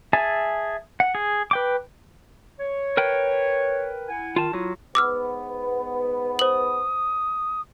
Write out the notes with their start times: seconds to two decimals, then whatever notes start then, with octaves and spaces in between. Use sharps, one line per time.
0.13 G#4 E5 G#5 A5
1.00 F#5
1.15 G#4
1.51 B4 G5 D6
2.60 C#5
2.97 A#4 B4 G5
4.08 E4 F#5 G#5
4.36 D#3 F4 A5
4.53 F#3 E4 F4
4.95 G#2 B3 D6 E6 F6
6.39 C5 D#6 F#7